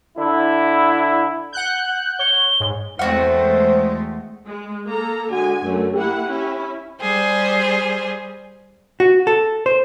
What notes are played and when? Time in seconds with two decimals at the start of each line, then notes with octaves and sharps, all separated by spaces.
0.18 D3 E4
1.53 F#5 F#6 G6
2.19 C#5 G7
2.60 G#2
2.99 E2 G#3 A3 C4 F#4 C5 F#5
4.46 G#3
4.86 A#3 A4 A#5
5.32 D3 G#3 F#4 G#5
5.64 F#2 D3 A3
5.94 A#3 E4 G4 F#5
6.27 C#4 E4
7.00 G3 G#4 C5
9.00 F#4
9.27 A4
9.66 C5